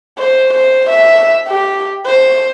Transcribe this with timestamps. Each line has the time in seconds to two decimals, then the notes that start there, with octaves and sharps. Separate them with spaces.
0.18 C5
0.53 C5
0.89 E5
1.47 G4
2.05 C5